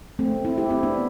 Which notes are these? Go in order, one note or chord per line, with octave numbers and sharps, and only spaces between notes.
A3 C4
C4 E4
E4 G4
C4 E4
B3 D4